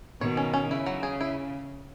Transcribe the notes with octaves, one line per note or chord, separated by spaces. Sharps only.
B2 D#3 C#5
C#4
C#4
C#3 E4
F#3
G#4
E4